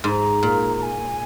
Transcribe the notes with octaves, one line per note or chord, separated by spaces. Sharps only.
G#2 A#5 C6
A#2
G#5